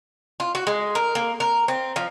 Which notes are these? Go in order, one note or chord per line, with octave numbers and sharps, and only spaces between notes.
F4
F#4
G#3
A#4
A#3
A#4
C4
F3